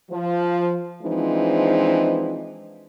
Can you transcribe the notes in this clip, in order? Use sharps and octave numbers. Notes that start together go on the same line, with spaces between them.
F3
E3 F3 G#3 C4 D4 D#4